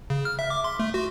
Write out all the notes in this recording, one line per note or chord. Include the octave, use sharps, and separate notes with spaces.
C#3
F6
E5
D6
C6
A3
F#4